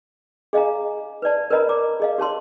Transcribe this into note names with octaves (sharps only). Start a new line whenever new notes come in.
G#4 D#5 F5 G#5 A#5
B4 C#5 D5 A5
A#4 B4 C#5 D#5 A#5 B5
C#5 D5 A#5 D6
G#4 D#5 F5
G4 C#5 A5 C6